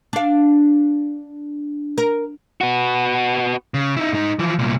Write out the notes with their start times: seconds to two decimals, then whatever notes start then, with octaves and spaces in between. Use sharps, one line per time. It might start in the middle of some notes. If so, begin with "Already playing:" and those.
0.13 D4 F5
1.98 A#4
2.61 B3 F#4
3.74 C#3
3.96 D#4 E4
4.13 G#2 D#4
4.39 E3 F3
4.59 C2 A#2